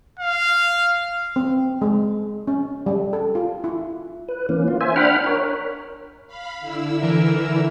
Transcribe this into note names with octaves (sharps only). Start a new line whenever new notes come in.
F5
C4
G#3
C#4
G3
A4
F4
E4
B4
E3 A#3 C#4
F4
C5 E5 G#5
D4 F#5 G5 B5 F6
A#4 C#5
F5 B5
D3 E4 E6
E3 A#4